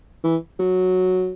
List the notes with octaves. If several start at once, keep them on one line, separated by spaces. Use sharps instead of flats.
E3
F#3